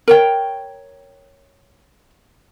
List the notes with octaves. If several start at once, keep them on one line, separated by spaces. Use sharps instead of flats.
A#4 C#5 G5